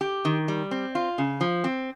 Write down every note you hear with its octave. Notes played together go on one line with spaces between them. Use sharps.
G4
D#3
G3
C4
F4
C#3
F3
C4